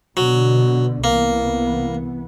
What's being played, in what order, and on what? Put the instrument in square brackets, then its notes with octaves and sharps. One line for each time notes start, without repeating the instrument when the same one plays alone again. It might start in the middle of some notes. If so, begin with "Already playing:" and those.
[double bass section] B2 D3 [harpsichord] F#3
[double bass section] C2 E3 B3 [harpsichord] A#3